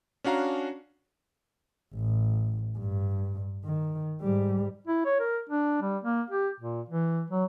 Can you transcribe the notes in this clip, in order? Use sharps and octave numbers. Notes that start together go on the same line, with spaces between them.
C#4 D4 F#4 F5 A#5
A1
G2
D#3
G#2 G3
E4
C#5
A#4
D4
G3
A#3
G4
A#2
E3
F#3